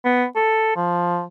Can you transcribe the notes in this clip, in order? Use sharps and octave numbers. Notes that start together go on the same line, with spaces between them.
B3
A4
F3